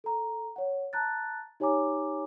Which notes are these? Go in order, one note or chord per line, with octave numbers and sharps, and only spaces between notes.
A4 A#5
C#5 F#5
A5 A#5 F#6 A6
D#4 G4 C#5 G#5 A#5 D6